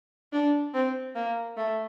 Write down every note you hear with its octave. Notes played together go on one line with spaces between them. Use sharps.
D4
C4
A#3
A3